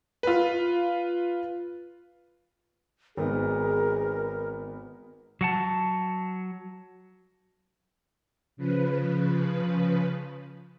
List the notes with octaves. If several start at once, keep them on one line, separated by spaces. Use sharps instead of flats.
F4 B4
G#1 B3 D#4 G#4 A#4
F#3 F#5 A5
C#3 F3 B4